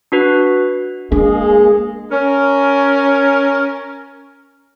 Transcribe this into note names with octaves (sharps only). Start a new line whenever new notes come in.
D4 F#4 B4
G#3 A#3 D4 G#4
C#4 A#4